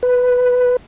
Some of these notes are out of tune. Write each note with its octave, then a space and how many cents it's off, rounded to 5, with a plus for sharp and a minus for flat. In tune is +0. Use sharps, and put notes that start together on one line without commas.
B4 +5